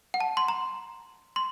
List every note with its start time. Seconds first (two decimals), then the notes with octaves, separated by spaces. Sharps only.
0.14 F#5
0.20 A5
0.37 C6
0.48 A#5
1.36 C6